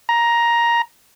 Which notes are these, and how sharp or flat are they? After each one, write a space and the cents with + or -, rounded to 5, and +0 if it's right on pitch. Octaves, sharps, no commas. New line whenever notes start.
A#5 +10